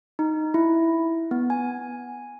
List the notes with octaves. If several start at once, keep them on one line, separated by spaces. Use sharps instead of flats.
D#4
E4
B3
G#5